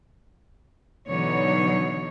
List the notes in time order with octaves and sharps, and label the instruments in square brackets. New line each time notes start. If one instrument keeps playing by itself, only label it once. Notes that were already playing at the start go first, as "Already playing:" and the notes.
[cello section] B2 D3 E3 F#3 D#4 C#5